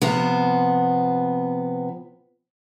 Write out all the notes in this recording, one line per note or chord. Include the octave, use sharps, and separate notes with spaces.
C3 F3 B3